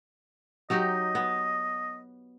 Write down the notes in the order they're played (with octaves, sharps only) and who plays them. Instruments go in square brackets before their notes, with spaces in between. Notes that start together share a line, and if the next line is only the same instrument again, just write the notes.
[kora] F#3 D#4 G4 [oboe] D#5
[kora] B3